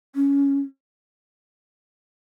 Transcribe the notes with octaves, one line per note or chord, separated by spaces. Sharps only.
C#4